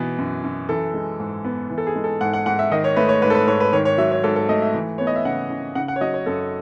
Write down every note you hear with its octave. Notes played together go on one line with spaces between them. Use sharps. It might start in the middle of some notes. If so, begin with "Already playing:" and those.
Already playing: B2 E3 B3
F#2
F#2
E3 A4
G#3
G#2
B3
E3
A4
G#4
G#3
A4
G#2 F#5
F#5
G#2 F#5
E5
D#3 D#5
C#5
A3 B4
C#5
G#2 B4
A4
B4
G#2 C#5
B4
D#3 C#5
C#5
F#3 E5
C#5
G#2 A4
A4
A3 D#5
E5
E3
B3 C#5
D#5
E5
C#3 F#5
C#3
C#3 F#5
F#5
C#5
F#3 D#5
C#5
F#2 A4